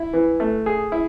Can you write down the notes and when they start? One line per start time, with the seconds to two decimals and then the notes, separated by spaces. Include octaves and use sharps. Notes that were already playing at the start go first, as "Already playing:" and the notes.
Already playing: E4
0.13 E3
0.40 A3
0.66 G#4
0.92 E4